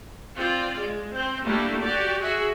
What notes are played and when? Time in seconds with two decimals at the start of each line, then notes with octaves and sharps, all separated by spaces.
0.37 C4 F4 D5
0.78 G#3
1.13 C4
1.45 G3 A3 A#3 D4 E4
1.81 F#4 G4 D5
2.21 F#4 G#4 E5